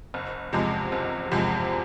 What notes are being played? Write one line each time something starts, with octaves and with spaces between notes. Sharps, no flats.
F#1
E2 C3 F3 G#3
F#1
E2 C3 F3 G#3